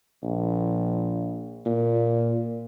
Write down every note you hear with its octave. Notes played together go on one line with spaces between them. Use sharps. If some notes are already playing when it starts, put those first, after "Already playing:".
A#1
A#2